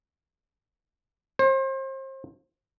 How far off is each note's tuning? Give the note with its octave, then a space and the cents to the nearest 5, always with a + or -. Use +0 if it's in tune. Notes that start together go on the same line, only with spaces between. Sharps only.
C5 +35